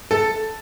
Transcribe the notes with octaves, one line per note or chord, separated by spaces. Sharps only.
A4